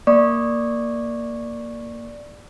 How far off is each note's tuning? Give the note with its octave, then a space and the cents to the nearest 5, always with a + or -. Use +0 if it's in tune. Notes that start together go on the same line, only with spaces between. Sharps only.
A#3 +0 D5 +0 C#6 -10